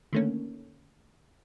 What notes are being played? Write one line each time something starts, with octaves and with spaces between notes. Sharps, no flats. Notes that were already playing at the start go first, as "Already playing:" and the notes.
D3 D#3 A3 A#3 C#4